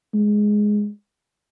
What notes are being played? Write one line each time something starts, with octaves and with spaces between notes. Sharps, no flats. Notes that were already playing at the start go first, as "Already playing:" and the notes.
G#3